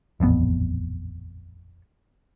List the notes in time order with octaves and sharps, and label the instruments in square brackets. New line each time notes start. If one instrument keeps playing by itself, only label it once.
[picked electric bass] D#1 A1 F2 B3